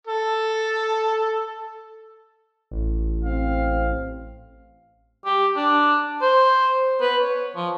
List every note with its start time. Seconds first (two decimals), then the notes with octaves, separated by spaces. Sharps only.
0.07 A4
2.71 A1
3.25 C4 F5
5.25 G4
5.56 D4
6.22 C5
7.01 B4
7.21 C#5
7.56 F3